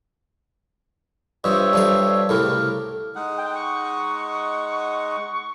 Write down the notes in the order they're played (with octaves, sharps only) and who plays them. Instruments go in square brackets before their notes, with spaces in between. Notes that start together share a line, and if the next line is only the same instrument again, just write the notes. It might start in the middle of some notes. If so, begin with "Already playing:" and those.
[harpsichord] G2 F3 [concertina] C#5 E5 [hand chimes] D5 D#6 E6
[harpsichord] G2 F3 F5 [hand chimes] A4 D5 A5
[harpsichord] C2 A2 C#3 [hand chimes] A4 D6 [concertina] A#4
[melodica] G#3 D#4 F#5
[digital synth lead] G5
C#6